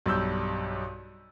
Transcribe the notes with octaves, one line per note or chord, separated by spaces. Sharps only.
B1 G2 E6 G6